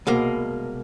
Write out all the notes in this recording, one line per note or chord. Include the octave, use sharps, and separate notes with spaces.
C2 B2 G#3 A#3